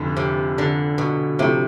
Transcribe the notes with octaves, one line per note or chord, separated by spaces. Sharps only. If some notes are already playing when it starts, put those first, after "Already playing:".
Already playing: F1 F2 D3
C3
D3
B2
A2 C3 F3 A3 E4